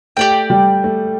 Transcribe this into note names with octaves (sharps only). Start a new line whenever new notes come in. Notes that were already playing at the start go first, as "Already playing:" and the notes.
A3 G4 D5 G5
G3
A3